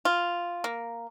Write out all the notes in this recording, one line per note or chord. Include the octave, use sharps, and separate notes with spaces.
F4
A#3